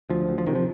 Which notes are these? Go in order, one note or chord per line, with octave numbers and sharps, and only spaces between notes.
D2 F3
D2
F3
C3 D#3
F3